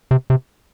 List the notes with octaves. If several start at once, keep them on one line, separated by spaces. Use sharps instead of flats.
C3
C3